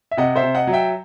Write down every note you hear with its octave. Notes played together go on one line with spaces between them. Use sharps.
E5
C3 D#5 F#5
C5 E5
C3
D#5 F#5
F#3
E5 G5